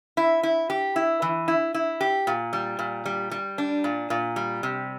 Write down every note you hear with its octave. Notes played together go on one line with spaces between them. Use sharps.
E4
E4
G4
E4
E3
E4
E4
G4
A#2
G3
A#2
G3
G3
D4
A#2
A#2
G3
C3